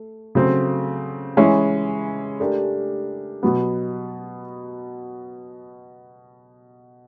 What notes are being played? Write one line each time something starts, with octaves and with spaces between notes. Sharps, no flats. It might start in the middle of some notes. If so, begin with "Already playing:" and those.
Already playing: A3
C#3 F#3 A3 C4
E3 G#3 C#4 E4
A3 D4 G4 A#4
B2 F#3 B3